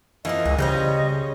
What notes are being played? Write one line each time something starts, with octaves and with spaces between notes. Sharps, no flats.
E3 F3 A#3 C4 F4 D#5
C#2 G#4
C#3 G3 C#4 C5 C#5 D#5